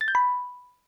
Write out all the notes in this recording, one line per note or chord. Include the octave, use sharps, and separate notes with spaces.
A6
G6
B5